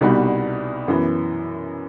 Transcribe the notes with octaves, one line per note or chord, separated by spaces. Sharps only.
C2 B2 G3 D#4 F#4
F#2 E3 B3